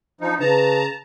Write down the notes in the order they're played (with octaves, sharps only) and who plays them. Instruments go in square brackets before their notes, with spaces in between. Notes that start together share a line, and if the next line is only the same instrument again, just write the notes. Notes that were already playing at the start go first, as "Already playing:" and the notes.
[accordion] F3 D#4 [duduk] D4
[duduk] C#3 [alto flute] B4 [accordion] A5 A#5